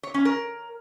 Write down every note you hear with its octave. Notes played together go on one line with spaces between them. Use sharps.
C#5
C#4
A#4